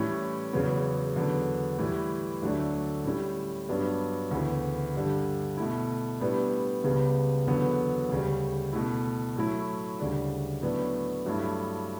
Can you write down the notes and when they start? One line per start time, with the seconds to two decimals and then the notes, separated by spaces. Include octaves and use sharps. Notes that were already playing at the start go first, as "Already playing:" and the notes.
Already playing: A2 E3 G3 C#4
0.53 E2 C#3 F#3 B3
1.15 E2 D3 F#3 B3
1.78 A2 E3 G3
2.42 D2 D3 F#3 A3 D4
3.05 A2 G3 C#4
3.69 G2 F#3 B3 D4
4.31 D2 C#3 E3 B3
4.94 G2 D3 G3
5.57 B2 A3 E4
6.20 A2 G3 B3 D4
6.84 C#2 C#3 G3 B3
7.47 E2 D3 F#3 B3
8.09 D2 C#3 G3
8.73 B2 A3 E4
9.36 A2 F#3 A3 E4
9.99 D2 C#3 G3 D4
10.62 A2 F#3 B3 D4
11.26 G2 F#3 A3 E4